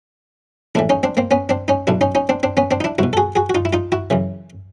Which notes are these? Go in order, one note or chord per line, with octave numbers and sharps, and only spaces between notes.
A#1 A2 E3 D4 E4
C#4 D#4
C4 D4
A#3 C4
B3 C#4
C4 D4
C#4 D#4
B1 B2 D4 E4
C#4 D#4
C#4 D#4
C4 D4
C4 D4
B3 C#4
C4 D4
D#4
D4 E4
C2 B2 E4 F#4
A4
F#4 G#4
F#4 G#4
F#4
D#4 F4
E4
D#4 F4
E4 F#4
F#2 C#3 E3